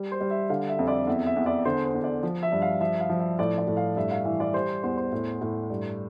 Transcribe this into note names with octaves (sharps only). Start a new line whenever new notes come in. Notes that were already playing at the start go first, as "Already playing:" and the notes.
Already playing: G3
C5
G3
E5
D3 F5
E5
F2
D5
E2 E5
E5
E2
D5
D3 C5
C5
E2
D5
F3
E5
G2
F5
F3 E5
F5
F3
E5
A2 D5
D5
A2
F5
G2 E5
F5
E3 E5
D5
G3 C5
E2 C5
C5
A2
A2
G2